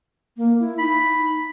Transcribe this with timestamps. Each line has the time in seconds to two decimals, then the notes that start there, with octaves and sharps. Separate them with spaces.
0.37 A#3
0.60 E4
0.79 D#4 B5